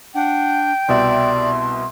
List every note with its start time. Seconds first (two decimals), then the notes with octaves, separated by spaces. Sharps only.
0.14 D4 F#5 G5
0.88 C2 B2 D5 E5 C6